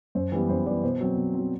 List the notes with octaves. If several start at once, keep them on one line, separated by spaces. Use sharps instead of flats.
F#2 C5
E3 G3 B3
F#2 C5
E3 G3 B3 B4 D5
B2 C5
F#3 C4
B2
F#3 C4